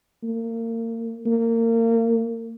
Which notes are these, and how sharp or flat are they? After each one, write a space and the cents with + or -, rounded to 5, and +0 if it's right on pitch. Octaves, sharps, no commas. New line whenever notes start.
A#3 -35
A#3 -30